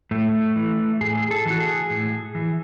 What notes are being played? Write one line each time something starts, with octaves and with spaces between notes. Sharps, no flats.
A2 A3
E3
A2 G#4
A4
E3
F#4
G#4
A2
E3